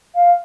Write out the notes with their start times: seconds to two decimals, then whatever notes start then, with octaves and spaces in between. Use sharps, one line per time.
0.15 F5